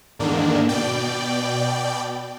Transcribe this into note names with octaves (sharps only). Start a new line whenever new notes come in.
E2 G#2 D3 D#3 A#3 D4
B2 D5 G5